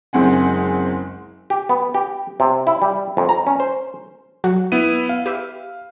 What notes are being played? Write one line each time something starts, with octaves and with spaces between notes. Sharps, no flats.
F#1 G#3 C4 F#5 G#5
G4
B3
G4
C3
E4
G3
F2
A#5
C#4
C5
F#3 F#4
B3 E4 D#7
F5
G4 B4 E5